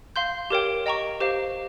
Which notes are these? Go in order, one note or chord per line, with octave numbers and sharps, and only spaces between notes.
F5 C6 G6
G4 A#4 C#5 G5
D#5 G5 A#5 C#6
G4 C5 F5